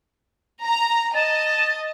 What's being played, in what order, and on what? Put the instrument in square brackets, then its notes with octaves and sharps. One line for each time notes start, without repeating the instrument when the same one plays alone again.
[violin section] A#5
[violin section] D#5 [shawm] A5